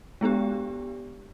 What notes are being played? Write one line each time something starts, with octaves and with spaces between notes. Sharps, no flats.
G#3 B3 D4 G4